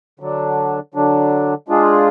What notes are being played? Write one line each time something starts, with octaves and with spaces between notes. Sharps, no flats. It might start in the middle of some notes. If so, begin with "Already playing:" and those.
D3 F#3 D4
D3 F#3 D4
G#3 D4 F4 G#4